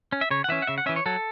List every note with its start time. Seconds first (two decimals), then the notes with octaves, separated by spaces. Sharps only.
0.12 C#4
0.21 E5
0.31 C#3 C#5
0.44 F#5
0.49 E3 C#4 E5
0.62 F#5
0.67 C#3 E5
0.78 F#5
0.86 E3 C#4 E5
0.96 C#5
1.06 F#3 A4